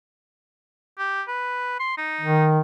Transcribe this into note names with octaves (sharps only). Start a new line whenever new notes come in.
G4
B4
C6
D#4
D#3